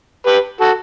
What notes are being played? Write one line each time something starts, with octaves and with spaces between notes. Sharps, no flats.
G4 B4
F#4 A4